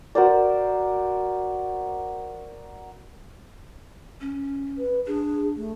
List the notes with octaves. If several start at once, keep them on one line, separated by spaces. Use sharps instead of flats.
F#4 A#4 C5 D5
C#4
B4
D4 G#4
A3